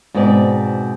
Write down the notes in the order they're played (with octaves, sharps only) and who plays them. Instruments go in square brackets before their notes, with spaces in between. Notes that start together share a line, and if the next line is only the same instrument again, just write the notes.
[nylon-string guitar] G#2 B2 C4 B4 D5